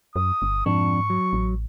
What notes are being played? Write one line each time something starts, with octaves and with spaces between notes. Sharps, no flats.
F#2 D#6
G1
F2 G#2 D4 C#6
F#3
A1